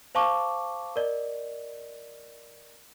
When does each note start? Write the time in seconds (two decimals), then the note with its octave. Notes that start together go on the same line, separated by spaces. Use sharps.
0.15 C5 F5 A5 C#6 D6
0.96 A#4 D5 D#5